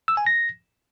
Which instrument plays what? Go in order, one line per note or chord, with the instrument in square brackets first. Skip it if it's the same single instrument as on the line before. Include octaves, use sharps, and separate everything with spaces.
[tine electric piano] E6
G#5
A#6